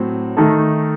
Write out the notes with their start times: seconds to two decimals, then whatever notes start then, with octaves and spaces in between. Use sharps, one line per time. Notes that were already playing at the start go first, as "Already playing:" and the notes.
Already playing: A2 F#3 C4
0.37 D#3 A3 D#4 A4